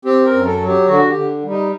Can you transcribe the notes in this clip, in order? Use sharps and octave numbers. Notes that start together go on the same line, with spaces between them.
C4 G4
A#4
F#2
A4
F#3
G4
D3 F#4
G4
D3
G3
D#4